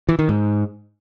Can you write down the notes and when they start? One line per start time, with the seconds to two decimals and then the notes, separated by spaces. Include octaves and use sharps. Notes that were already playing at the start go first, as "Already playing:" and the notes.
0.09 E3
0.19 D#3
0.29 G#2